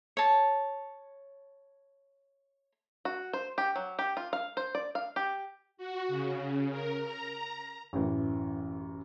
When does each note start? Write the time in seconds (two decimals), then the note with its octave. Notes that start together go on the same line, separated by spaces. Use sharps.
0.17 C#5 A5
3.05 F#4
3.33 C5
3.58 G4
3.76 F#3
3.99 G4
4.17 F4
4.33 F5
4.57 C5
4.75 D5
4.95 F5
5.16 G4
5.77 F#4
6.08 C#3
6.70 A#4
7.03 A#5
7.93 A1 F#2 E3